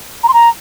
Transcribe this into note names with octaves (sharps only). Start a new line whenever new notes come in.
A#5
C6
A#5